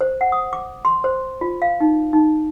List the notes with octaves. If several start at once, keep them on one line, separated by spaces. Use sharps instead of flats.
C5
F#5
D#6
D6
C6
C5
F4
F5
D#4
D#4